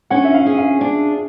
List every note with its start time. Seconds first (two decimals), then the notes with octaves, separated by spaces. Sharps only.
0.10 C#4 F#5
0.24 E5
0.34 F5
0.46 G#4
0.58 F5
0.81 D4